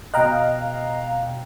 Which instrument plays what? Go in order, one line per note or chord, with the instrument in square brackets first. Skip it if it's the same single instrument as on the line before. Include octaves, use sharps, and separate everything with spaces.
[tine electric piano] B2 G5 F#6 [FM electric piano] D#5 F5 A#5